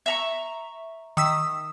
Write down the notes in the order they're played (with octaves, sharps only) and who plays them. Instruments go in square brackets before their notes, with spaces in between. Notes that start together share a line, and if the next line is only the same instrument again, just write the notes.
[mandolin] E5 A#5 C#6
[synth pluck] D#3 E6 B6 [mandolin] D#6